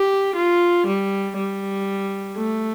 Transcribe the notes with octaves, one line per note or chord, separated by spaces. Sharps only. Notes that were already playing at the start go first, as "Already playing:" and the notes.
Already playing: G4
F4
G3
G3
A3